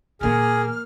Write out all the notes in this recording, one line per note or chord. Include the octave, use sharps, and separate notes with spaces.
A#2 E3 A#3 G#4 F6